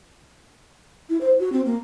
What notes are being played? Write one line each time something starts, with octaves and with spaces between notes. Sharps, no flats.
E4
C5
F#4
C4
A#3